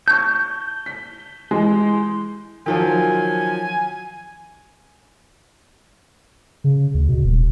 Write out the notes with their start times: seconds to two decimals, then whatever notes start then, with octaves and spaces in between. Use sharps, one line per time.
0.08 A5 C#6 G6
0.86 B6
1.51 E3 G#3
2.66 D#3 F3 F#3 G#5
6.64 C#3
6.94 D2
7.08 B2
7.24 D#1